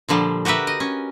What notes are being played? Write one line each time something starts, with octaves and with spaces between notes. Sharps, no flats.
A#2 D3 F3 G3
F#4 G4 A#4 B4 E5
D#5
C#4